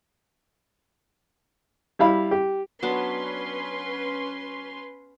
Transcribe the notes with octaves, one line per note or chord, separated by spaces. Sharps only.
G3 E4 F5 B5
G4
F#3 B3 C#4 D4 B4 C6